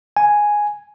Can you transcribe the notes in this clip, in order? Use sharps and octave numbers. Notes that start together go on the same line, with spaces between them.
G#5